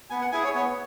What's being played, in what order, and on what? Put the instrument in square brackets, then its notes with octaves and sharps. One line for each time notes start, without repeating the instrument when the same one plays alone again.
[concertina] B3 G#5
F#5
E4 G#4 G#5
C#5
B3 C#5